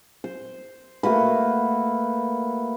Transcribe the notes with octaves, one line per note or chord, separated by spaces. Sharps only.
C5
A3 A#3 F#4 B4